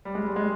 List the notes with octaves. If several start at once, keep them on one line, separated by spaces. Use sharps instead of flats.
G3
G#3
G3
G#3